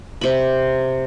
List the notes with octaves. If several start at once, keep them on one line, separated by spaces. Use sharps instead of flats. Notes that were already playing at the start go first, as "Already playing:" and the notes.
C3 B5